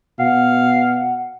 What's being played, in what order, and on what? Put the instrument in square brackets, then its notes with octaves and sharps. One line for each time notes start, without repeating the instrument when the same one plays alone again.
[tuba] B2 [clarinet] F5 [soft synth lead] F#5